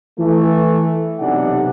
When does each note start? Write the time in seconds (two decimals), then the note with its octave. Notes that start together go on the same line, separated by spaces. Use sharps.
0.18 E3 A3
1.19 B1 C3 E3 D4 D#4 F#5